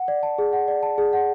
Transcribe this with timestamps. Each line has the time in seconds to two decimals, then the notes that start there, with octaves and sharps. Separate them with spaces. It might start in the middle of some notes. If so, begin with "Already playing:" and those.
Already playing: F#5
0.08 D5
0.23 A5
0.38 G#4
0.53 F#5
0.68 D5
0.83 A5
0.98 G#4
1.13 F#5